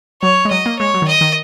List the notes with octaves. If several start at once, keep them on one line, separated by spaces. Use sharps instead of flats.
F#3 C#5
G#3
F#3 D#5
A#3
G#3 C#5
F#3
D#3
D#5
D#3